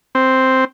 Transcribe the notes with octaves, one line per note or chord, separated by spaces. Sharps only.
C4